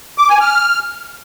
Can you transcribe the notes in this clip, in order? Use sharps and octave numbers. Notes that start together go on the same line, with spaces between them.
D6
G#5
F6